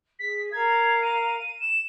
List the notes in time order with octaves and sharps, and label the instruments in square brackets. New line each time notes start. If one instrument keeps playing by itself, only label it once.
[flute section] G#4 [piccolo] B6
[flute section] A#4 F5 A#5 [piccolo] G#6
[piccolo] D#7
E7